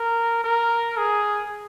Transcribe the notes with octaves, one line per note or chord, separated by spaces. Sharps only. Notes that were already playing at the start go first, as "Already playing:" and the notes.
Already playing: A#4
A#4
G#4